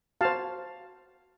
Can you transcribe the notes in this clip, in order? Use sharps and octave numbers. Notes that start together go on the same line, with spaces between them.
F#4 C5 F5 A5